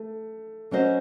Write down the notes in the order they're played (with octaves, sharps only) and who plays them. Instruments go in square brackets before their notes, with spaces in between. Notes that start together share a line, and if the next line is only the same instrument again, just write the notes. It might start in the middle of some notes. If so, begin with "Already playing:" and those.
Already playing: [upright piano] A3
[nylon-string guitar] F#3 C#4 F#4 C5 D#5